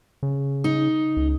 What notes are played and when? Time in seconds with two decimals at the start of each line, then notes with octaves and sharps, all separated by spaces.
0.23 C#3
0.64 D#4
1.17 C#2